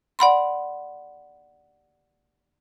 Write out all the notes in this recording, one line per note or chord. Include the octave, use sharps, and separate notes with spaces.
D5 F#5 B5 C6